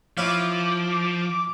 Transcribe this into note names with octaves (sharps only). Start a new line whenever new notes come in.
F3 E4 C#5 F5 D6